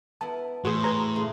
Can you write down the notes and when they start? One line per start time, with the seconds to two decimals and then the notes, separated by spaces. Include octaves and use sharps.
0.21 B3 E4 A#4 A5
0.65 E2 A2 F#4 G#4 C5 C6
0.84 G#4 B4 A#5
1.16 C#3 A3